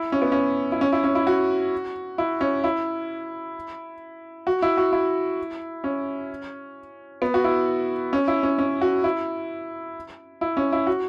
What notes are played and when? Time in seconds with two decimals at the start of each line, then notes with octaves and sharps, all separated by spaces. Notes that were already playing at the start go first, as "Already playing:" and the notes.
Already playing: E4
0.12 C#4
0.22 B3
0.32 C#4
0.72 E4
0.81 C#4
0.92 E4
1.04 C#4
1.15 E4
1.27 F#4
2.18 E4
2.41 C#4
2.64 E4
4.47 F#4
4.62 E4
4.77 F#4
4.92 E4
5.84 C#4
7.22 B3
7.34 F#4
7.44 E4
8.13 C#4
8.28 E4
8.43 C#4
8.59 C#4
8.81 F#4
9.04 E4
10.41 E4
10.57 C#4
10.72 E4
10.87 F#4